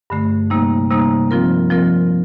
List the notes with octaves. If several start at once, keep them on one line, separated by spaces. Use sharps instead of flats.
G2 D3 A3
C3 G3 A#3 D#4
C3 G3 A#3 D#4
F3 C4 F4 A#4
F3 C4 F4 A#4